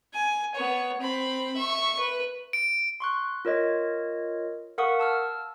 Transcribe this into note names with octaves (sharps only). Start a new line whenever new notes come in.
G#5
B3 C#5
C4 B5
E5 C#6
B4
D7
C6 C#6 F#6
F4 A#4 C#5 D#5
A#4 F5 F#5 C#6 D#6
A5 E6 F6